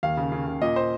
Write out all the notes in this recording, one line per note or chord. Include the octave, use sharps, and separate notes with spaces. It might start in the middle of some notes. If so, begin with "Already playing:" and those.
D#2 F5
C#3
C#3
C#3
A#2 D#5
C5